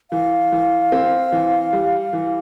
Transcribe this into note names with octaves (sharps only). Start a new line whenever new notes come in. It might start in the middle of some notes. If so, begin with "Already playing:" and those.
E3 F5
E3
C4
E3
G3
E3